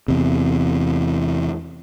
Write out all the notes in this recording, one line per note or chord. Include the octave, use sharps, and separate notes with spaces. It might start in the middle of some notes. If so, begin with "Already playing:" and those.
E2 C3